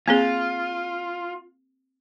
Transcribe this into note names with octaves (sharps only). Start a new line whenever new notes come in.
A#3 C4 F4 G#4